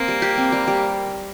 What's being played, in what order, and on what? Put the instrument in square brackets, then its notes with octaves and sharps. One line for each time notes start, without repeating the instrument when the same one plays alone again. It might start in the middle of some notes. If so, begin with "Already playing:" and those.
Already playing: [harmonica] A#3 [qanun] C4
[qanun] G3
G4
C4
G3
G3